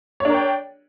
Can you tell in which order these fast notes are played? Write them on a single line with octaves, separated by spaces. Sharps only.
C#5 D4 A#4 G5